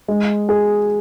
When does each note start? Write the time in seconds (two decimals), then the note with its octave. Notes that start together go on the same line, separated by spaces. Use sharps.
0.08 G#3
0.49 G#4